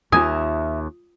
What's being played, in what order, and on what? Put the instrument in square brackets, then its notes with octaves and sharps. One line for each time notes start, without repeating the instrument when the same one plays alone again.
[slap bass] D#2 [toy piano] F4 D#6 [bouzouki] A#4 E5 [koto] G#5